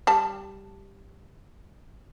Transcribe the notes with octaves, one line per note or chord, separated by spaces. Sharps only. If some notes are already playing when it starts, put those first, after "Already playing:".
G3 A5